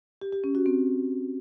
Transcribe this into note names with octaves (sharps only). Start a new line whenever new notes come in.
G4
G4
C#4
F#4
C4